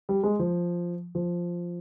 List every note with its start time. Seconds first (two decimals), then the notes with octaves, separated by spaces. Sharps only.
0.09 G3
0.23 G#3
0.39 F3
1.15 F3